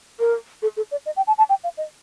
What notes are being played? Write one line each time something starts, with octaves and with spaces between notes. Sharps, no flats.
A#4
A4
A4
D5
D#5
G5
A5
A5
G5
F5
D#5